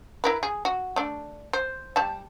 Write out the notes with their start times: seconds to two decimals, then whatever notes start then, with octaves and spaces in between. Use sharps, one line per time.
0.24 E4 A#4 B4
0.43 G#4
0.65 F#4
0.96 A3 D4
1.53 C5
1.96 G3 A5